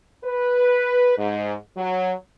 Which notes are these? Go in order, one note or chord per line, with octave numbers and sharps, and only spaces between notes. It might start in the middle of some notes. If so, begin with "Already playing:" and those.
B4
G#2
F#3